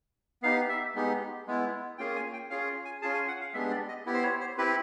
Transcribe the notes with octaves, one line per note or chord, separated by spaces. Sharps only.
B3 D#4 G4 F5
E5
G#3 B3 D#4 G4
G#3 B3 E4
A#3 C#4 F4 G#4 G5
G#5
G5
C#4 F4 G#4 F5
G#5
C#4 F4 G#4 A5
G#5
F#5
F5
G#3 B3 D4 G4 E5
D5
D#5
B3 E4 G4
C5
C#5
C5
C4 E4 G4 B4